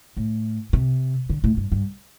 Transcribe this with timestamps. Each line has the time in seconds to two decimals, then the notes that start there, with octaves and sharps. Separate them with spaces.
0.17 A2
0.73 C3
1.30 D3
1.44 A2
1.57 G2
1.72 G2